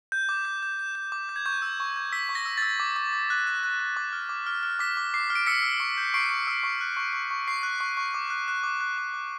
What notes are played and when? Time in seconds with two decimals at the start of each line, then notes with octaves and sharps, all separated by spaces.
0.12 G6
0.29 D6
0.45 G6
0.63 G6
0.79 G6
0.95 G6
1.12 D6
1.29 G6
1.36 G#6
1.46 C#6 G6
1.62 E6
1.80 C#6
1.96 G6
2.12 E6 B6
2.29 C#6
2.35 A#6
2.46 E6
2.57 E6 A6
2.80 D6
2.96 D6
3.13 D6
3.30 F#6
3.47 F#6
3.63 F#6
3.79 F#6
3.97 D6
4.13 F6
4.29 D6
4.46 F6
4.63 F6
4.79 D6 B6
4.97 D6
5.14 D6 C7
5.30 F6
5.35 D7
5.46 E6 B6 C#7
5.63 E6
5.80 C#6
5.97 G6
6.14 C#6 C7 D7
6.30 C#6
6.47 E6
6.63 C#6
6.81 F#6
6.97 C#6
7.13 C#6
7.31 C#6
7.48 C#6 C7
7.63 F#6
7.80 C#6
7.97 C#6
8.14 D6
8.30 F#6
8.48 F#6
8.63 D6
8.81 F#6
8.98 D6
9.14 D6